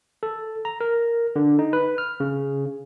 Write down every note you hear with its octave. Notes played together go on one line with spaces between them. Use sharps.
A4
A#5
A#4
D3
D#4
B4
F6
C#3